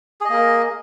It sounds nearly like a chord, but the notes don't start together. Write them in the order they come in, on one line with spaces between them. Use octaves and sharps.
G#4 D#5 A#3 A#4